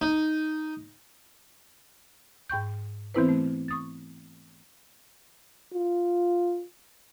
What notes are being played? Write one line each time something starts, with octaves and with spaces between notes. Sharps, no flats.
D#4
G#2 G5 C#6 G6
E3 B3 C4 E4 B4 C5
A3
C#6 D#6 A6
F4